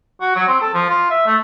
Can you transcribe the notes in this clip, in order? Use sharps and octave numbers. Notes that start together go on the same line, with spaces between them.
F#4
F#3
C4
A4
F3
F4
E5
A3